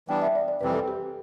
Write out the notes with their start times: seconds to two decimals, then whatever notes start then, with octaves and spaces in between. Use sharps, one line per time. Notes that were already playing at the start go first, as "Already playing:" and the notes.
0.08 E3 G3 B3 D4 G5
0.22 E5
0.35 D5
0.48 D5
0.61 F2 C3 E3 G3 C4 B4
0.74 A4
0.88 G4